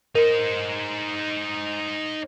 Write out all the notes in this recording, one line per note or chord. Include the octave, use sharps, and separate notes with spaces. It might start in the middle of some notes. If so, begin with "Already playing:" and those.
D#4 A#4 C5